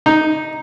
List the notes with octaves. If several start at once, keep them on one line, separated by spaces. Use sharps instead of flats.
D#4